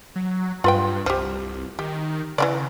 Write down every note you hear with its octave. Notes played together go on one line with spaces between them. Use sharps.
F#3
G2 F4 B4 G5
C2 F3 G4
D#3 G4
C#3 E3 A#3 D5